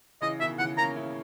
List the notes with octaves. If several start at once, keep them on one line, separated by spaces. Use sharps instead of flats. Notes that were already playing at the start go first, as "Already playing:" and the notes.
C#3 E3 D#5
B2 D#3 E5
C#3 E3 F#5
A#3 C#4 A#5
C#4 E4